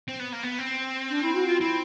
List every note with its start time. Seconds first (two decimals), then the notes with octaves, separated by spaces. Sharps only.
0.09 C4
0.20 B3
0.33 A#3
0.44 B3
0.59 C4
1.10 D4
1.23 E4
1.35 F#4
1.47 F4
1.61 C4 E4